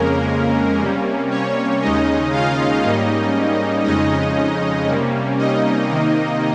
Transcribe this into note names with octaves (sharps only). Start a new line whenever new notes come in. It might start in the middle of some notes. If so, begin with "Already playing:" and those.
Already playing: F2 C#3 G#3 A#3 C#4 A#4
C3 G3 A#3 C#4
C#4 C#5
D#2 C#3 G#3 C#4 D#4 D#5
F4 F5
G#2 G3 A#3 C#4 D#4 D#5
F2 C#3 G#3 C#4 D#4 D#5
C3 G3 A#3 C#4
D#4 D#5
C3 D#3 A#3